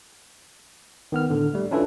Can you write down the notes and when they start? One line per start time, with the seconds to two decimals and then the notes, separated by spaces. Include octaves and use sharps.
1.12 D#3 B3 F6
1.30 A2 D3
1.54 G3 A3
1.71 C#4 D4 E4 F4 A4 B4